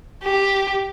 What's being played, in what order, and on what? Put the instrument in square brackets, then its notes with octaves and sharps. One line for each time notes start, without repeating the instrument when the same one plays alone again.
[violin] G4